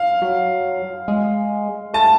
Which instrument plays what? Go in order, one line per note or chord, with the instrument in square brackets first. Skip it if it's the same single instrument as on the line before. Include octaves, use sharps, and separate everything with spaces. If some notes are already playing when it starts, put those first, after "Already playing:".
Already playing: [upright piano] F5
[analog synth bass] F#3
G#3
[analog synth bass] A3 [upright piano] A5